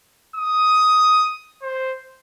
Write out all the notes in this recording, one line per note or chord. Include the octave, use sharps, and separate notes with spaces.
D#6
C5